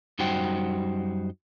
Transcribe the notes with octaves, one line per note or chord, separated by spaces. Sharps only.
F#2 G3 D#4 F#4 C5 G5